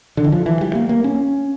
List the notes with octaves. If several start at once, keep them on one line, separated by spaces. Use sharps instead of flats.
D3
E3
F3
E3
G3
A#3
A#3
C#4